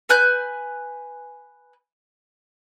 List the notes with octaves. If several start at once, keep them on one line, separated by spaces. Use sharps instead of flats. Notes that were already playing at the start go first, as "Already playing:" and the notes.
B4 G#5 F#6 G6